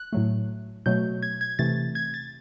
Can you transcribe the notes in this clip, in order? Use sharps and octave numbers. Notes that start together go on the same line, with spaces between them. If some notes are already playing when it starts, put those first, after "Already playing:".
Already playing: F#6
A2 F#3 A3
B2 F#3 A3 G6
G#6
G#6
C3 E3 A3 A6
G#6
A6